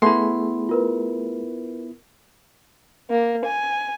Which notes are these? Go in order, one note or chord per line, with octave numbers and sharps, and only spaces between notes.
A3 B3 E4 G#4 C6
F4 A#4 B4
A#3
G#5